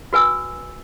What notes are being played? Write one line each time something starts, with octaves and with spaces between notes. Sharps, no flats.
F#4 B4 G#5 E6